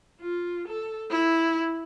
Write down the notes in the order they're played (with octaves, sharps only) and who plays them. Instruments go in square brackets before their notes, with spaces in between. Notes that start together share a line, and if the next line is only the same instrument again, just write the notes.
[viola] F4
A4
E4